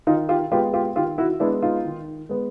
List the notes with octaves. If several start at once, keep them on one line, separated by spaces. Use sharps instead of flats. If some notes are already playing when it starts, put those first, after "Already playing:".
D#3 D#4 F4
F4 G4
G#3 B3 F4 G4
F4 G4
D#3 F4 G4
E4 F#4
G#3 B3 D4 E4
D#4 F4
D#3
G#3 B3